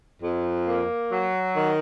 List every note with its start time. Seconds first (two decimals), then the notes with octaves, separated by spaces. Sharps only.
0.23 F2
0.67 A#3
1.12 F#3
1.56 D#3